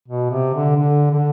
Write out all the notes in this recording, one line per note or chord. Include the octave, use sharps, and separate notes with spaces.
B2
C3
D3
D3
D3